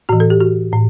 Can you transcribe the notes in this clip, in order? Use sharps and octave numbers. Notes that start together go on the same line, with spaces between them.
A2 E3 F#4
A4
G4
F#4
A2